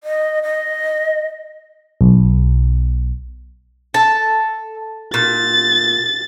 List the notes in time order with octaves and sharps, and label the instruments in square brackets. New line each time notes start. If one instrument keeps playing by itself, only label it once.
[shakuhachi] D#5
D#5
[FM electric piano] B1
[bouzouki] A4 [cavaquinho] A5
[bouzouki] A#2 [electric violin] A6